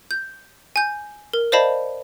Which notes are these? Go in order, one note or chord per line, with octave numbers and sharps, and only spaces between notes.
G6
G#5 G6
A#4
C5 D5 D#5 F5 A5 B5